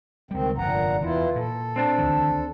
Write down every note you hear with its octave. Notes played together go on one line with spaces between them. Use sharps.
C#2 D#3 G3 C4
F1 G2 A#2 D3 F#5 A#5
E2 E3 E4 F4
A#2 A4
C4 D4 A5
D2 D#3 E3